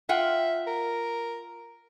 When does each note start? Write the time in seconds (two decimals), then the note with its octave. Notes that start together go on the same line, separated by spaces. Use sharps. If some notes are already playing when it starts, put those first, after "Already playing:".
0.09 F4 E5 F#5 G5
0.67 A#4